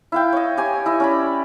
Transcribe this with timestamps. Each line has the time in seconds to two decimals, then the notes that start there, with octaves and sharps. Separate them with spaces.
0.12 E4 F5 G5
0.33 C#5 D#5
0.57 G4 C#5 G#5
0.86 E4 D#5
1.00 C#4 D5 B5